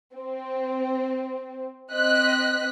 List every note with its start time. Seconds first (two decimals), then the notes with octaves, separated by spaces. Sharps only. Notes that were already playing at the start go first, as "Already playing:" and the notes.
0.14 C4
1.92 C4 D#5 F#6 B6